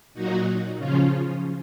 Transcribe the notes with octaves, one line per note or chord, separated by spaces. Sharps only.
A#2 F#3 D#4 F#4
C#3 F3 C#4 F4